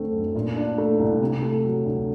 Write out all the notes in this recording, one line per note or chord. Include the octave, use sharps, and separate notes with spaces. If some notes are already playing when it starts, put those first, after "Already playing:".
Already playing: D2 D3 A3 C4
F#2
A#2
D4
A3
C2
C3
A3
F#3
D2